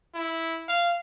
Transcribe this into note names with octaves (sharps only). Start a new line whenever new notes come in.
E4
F5